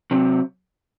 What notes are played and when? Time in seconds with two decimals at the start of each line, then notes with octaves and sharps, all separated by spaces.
0.11 C3 F#3 C4